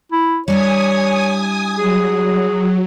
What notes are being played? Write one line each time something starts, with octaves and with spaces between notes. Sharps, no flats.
E4
G3 D4 E4 C#5 G#5 D#6
F#3 G#4